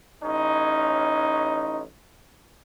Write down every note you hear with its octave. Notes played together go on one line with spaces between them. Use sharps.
A1 C#4 D#4